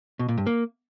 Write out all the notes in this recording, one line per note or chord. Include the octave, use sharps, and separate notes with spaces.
B2
A#2
G2
A#3